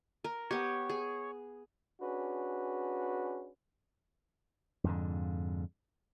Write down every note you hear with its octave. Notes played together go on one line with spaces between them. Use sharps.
A#4
B3 G4 C#5
G#4
C#4 D4 F#4 G#4 B4
F2 G#2 D3